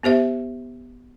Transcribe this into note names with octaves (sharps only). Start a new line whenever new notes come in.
B3 G4 C5 E5